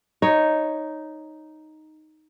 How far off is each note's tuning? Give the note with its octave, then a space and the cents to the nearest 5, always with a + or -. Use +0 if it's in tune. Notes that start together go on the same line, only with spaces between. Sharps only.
D#4 +0 C#5 +0